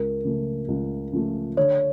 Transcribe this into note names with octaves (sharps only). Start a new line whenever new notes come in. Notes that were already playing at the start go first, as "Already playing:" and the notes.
Already playing: C#2 A#4
C#3 F3 A3
C#2
C#3 F3 A3
D3 C#5